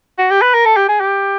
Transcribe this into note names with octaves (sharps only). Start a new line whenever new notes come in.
F#4
G4
B4
A#4
A4
G4
G#4
G4